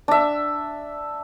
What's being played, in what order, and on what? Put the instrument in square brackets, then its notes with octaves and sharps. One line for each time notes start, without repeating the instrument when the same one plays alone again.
[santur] D4 E5